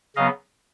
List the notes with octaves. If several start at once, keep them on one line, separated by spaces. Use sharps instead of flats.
C#3 F#3 B3 D#5 F5